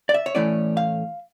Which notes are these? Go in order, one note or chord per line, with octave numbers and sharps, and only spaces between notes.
D5
E5
C#5
A2 E3 A3 C#4 E4 D5
F5